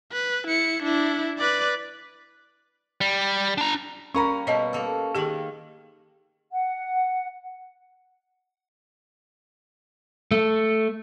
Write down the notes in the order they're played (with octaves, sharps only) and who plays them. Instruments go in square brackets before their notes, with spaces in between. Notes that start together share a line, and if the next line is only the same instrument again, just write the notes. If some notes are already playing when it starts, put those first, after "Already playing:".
[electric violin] B4
E4 C#7
D4 E4
B4 D5
[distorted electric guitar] G3
D4 A#5
[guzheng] G3 A#3 [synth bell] C#4 A#4 [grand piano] A#5 B5 C#6
[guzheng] B2 A#3 [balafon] C#5 D#5 A5
[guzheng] A#3 A4
[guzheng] D#3 A#3 [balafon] G4 G#4
[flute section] F#5
[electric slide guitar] A3